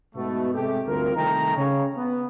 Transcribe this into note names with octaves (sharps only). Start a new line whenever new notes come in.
G#2 B2 A3
C3 G#3 A3 G4
G1 D2 G#2 C4 F4 A#4
C2 D#3 A3 D#5 G5 A#5
C#3 C#5
B3